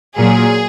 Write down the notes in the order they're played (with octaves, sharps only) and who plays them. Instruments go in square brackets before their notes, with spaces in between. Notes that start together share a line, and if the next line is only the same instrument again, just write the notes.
[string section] A#2 F#3 G#4